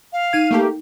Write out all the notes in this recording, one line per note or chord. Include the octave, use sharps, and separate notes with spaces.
F5
D#4 F6 G#6 D#7
A3 A#3 G4